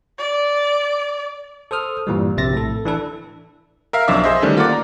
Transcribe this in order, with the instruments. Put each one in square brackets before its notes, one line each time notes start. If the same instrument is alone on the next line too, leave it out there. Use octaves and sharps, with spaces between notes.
[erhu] D5
[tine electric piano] A4 C5 D#6 F6
G2 A#2 E3 G3
A#1 C3 E5 A6 A#6
A2 A4
E3 D4 A4 B4
[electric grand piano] A#4 E5 F5
B1 F2 D4 E5 D6
G#4 C5 D#5 E5
D3 D#3 G3 A3 C#4 D4
A#3 F4 A#4 F#5 D6 A6
D5 A#5